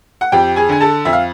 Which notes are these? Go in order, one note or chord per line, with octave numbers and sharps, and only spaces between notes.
F#5
F2 G4 G5
G#4 G#5
D3 G#5
A4 A5
F2 E5
F5